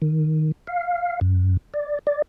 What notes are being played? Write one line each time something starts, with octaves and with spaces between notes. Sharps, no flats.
D#3
F5
F#2
D5
D5